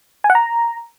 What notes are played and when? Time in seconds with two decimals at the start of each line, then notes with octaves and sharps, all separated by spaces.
0.24 G#5
0.30 F#5
0.35 A#5